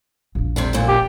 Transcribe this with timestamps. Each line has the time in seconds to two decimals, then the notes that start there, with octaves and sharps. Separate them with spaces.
0.35 E1 A#1
0.56 C3 G3 D4
0.73 F#2 A#2
0.88 G4